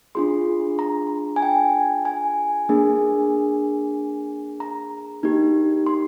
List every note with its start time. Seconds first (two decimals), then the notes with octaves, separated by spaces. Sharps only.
0.15 D4 F4 G#4 C6
0.79 A#5
1.36 G#5
1.43 G5
2.05 G#5
2.69 A#3 D4 G#4
4.60 A#5
5.23 A#3 D#4 G4
5.86 C6